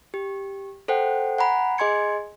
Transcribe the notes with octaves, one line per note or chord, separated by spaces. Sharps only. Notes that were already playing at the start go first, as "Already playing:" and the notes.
G4
A4 C5 F#5 G5
F#5 G#5 A#5 B5
G#4 D#5 G#5 C6 G#6 C#7